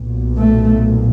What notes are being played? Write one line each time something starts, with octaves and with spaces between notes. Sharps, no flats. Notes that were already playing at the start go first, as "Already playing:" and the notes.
Already playing: B1 A#2
A3